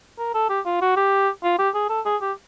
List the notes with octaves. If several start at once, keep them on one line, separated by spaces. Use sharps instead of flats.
A#4
A4
G4
F4
F#4
G4
F4
G4
G#4
A4
G#4
G4